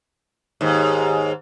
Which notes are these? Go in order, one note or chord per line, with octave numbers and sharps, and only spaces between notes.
D#2 G#2